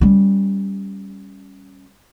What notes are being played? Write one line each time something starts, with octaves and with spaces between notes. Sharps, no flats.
G3 C#4